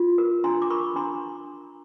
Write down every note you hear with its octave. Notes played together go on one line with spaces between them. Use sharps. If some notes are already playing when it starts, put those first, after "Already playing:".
Already playing: F4
A#4
D4 A#5 C6
D6
A#4 B5 C#6
D4 A#5 C6